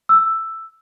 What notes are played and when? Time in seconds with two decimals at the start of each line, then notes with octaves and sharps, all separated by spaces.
0.09 E6